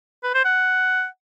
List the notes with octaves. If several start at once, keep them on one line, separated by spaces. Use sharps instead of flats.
B4
C5
F#5